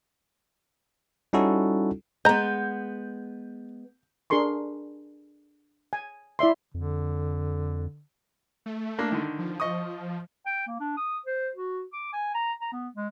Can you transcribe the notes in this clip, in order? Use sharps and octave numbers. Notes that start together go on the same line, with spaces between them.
G3 C#4 D#4 E4 F#4 A4
G#3 B3 D#5 A#5 G6
D4 G#4 A#4 C6 C#6
G#5
E4 D5 E5 C6
F2 D3
A3
A#3 D4
D3 D#3
F3
D#5 C#6 D#6
G5
A#3
D4
D#6
C5
F#4
D6
G#5
A#5
A#5
B3
G#3